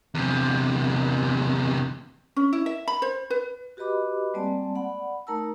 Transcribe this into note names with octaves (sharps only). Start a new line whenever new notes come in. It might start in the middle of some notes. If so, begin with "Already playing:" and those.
E2 C3
C#4
E4
E5
B5
C5
B4
F#4 G4 B4 D#5 B5 D6
G3 G#3 A#3 C4 D5 A5
D5 F#5 B5
A3 D#4 A#4 A5 A#5 E6